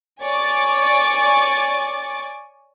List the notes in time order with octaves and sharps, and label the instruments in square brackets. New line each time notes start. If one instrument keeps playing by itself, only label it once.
[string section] C#5 D5 G#5 C#6 D6 A6